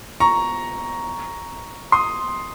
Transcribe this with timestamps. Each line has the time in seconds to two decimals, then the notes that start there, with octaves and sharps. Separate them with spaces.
0.20 A#5 C#6
1.92 C6 D#6